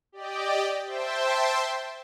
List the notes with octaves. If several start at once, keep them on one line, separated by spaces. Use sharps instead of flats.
G4 D5 D#5 G5
C5 E5 G5 A5 C6